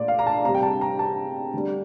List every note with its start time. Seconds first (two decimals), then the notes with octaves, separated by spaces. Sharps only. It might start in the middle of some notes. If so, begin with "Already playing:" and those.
Already playing: A#2 A3 D5
0.08 F5
0.19 A#5
0.27 A5
0.44 C3 A#5
0.49 G3
0.55 G5
0.63 A5
0.81 A#5
0.99 A5
1.54 D3 G3